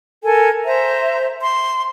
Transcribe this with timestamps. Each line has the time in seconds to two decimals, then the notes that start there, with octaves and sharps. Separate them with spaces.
0.23 A4 A#4 G#5
0.65 C5 E5 A#5
1.41 C6